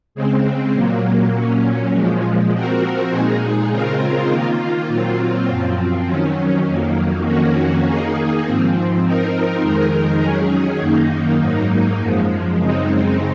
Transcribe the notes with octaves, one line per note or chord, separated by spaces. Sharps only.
C#3 G#3 C4
A#2 F#3 A#3
A#2 F#3 C#4
A#2 F3 G#3
F3 C4 F#4 A#4
A#2 G#3 D#4 G#4
C#3 G#3 C4 F4 A#4
D#3 A#3 F4
A#2 F#3 C4 F4
F#2 F3 C4
D#3 F#3 C#4
F2 D#3 F#3 A#3
F2 D#3 A#3 C#4 F#4
D#3 A#3 D#4 G#4
G#2 F3 C4
F3 C4 D#4 A#4
F2 D#3 G#3 D#4 A#4
D#3 F#3 C#4 G#4
F#2 D#3 A#3 D#4
G#2 F#3 A#3 D#4
F#2 F3 G#3
F#2 C#3 G#3 C4 D#4